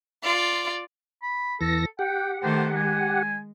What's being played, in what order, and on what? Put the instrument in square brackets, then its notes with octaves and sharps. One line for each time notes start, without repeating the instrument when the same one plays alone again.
[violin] F4 D5
[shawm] B5
[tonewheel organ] E2 E3 A#6 [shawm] A4
[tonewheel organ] G4 F#5 [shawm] G5
[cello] D#3 A3 [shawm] C5
[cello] G#3 [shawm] G#5